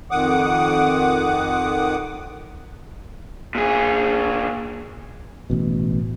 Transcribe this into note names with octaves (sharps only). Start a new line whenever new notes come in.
F2 D#3 F#5 D6 D#6
A#2 G#4
A1 B2